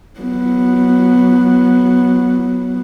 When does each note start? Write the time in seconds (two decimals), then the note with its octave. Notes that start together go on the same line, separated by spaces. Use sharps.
0.20 F#3 B3